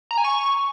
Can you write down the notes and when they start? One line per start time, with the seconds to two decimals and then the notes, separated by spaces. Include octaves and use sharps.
0.11 A#5
0.18 G#5
0.24 C#6